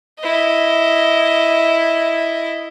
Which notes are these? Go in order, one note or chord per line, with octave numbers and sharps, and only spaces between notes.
E4 D#5